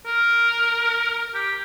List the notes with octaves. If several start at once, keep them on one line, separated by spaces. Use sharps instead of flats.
A#4
G4